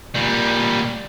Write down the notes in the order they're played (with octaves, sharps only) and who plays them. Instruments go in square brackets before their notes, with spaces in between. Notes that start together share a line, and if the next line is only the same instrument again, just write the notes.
[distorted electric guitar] A#2 G3